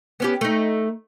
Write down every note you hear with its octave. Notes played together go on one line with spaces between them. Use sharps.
B3 C#4 G4
A3 D#4